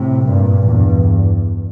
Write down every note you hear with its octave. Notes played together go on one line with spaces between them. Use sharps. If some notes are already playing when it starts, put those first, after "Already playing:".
Already playing: A2 C3
G2 A#2
E2 G2